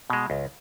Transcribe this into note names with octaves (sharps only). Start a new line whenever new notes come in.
B2 G#3
C#2